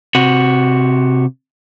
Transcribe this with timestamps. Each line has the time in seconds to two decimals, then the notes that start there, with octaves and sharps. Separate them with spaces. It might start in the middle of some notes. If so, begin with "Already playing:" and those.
0.15 C3 F#4